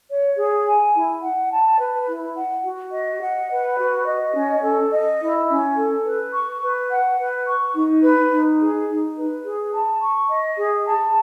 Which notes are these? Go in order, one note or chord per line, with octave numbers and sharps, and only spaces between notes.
C#5
G#4
G#5
E4
F#5
A5
B4
E4
F#5
F#4
D#5
F#5
B4
F#4
D#5
C#4
A4
D#5
E4
C#4
A4
B4
C#6
B4
F#5
B4
C#6
D#4
B4
D#4
G#4
D#4
B4
G#4
A5
C#6
D#5
G#4
A5